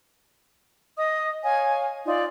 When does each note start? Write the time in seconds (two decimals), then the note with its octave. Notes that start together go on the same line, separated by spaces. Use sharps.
0.97 D#5 D#6
1.44 C#5 F5 G#5
2.05 D#4 F4 D5